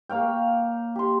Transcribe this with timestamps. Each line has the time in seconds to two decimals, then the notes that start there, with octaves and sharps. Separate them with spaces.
0.09 A#3 C#5 F5 G5
0.96 G4 C6